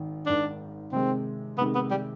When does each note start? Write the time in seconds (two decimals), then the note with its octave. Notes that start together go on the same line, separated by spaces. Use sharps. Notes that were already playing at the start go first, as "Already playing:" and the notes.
Already playing: G#1 D#3
0.26 G#1 G#2 D#3 D4
0.92 C3 D#3 G#3 C4
1.58 C3 D#3 G#3 B3
1.75 B3
1.91 G3